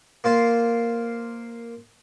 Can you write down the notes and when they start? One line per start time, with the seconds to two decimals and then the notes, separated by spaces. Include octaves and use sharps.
0.24 A#3 F4 C5